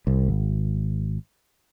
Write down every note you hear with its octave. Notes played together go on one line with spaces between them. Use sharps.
C2
G#1